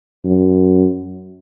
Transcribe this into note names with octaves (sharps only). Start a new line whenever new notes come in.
F#2